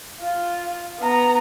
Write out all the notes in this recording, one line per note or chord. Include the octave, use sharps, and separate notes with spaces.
F4
B3 A#5